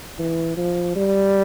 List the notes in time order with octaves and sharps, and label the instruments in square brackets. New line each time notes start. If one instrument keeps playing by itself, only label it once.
[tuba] E3
F3
G3